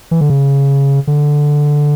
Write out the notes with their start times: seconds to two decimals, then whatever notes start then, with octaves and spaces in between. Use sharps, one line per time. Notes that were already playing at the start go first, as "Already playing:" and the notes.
0.11 E3
0.21 D3
0.30 C#3
1.07 D3